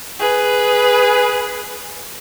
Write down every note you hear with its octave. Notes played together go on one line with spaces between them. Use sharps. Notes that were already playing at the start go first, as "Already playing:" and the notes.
G#4 B4